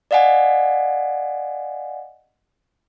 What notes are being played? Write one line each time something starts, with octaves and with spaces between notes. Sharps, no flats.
D5 D#5 F5 F#5 G#5